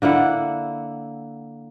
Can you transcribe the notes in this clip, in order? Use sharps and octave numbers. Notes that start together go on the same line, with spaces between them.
D3 A#3 E4 F#5